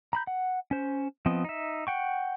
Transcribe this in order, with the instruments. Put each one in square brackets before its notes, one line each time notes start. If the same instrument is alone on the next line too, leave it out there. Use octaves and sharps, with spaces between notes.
[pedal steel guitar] A#5 B5 G6
F#5
C#4 C5
F3 B3 C4 D#5
D#4 E5
F#5 G5 C#6